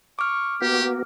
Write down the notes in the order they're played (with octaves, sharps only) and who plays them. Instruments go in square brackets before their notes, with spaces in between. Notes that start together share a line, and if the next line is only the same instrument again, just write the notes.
[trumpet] C#6 [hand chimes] D6 F6
[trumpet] A#3 [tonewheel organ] B3 F#4 [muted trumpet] G4